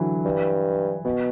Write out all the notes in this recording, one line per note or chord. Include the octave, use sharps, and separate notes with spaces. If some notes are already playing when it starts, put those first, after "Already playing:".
Already playing: D3 E3 F#3
G2
B2 B3